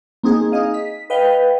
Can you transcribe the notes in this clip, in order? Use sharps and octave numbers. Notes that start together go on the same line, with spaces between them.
A#3 C4 D#4 G#4
D#4 G#4 D#5 F5
B6
B4 D#5 F5 G5